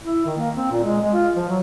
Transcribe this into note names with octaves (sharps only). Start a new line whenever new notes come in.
E4
D#3
A#3
C4
A#2
G#3
G#3
F4
F3
F#3